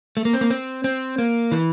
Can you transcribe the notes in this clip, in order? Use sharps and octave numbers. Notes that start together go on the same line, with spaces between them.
A3
A#3
C4
A#3
C4
C4
A#3
E3